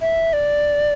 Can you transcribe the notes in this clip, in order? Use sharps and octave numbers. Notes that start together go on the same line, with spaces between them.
E5
D5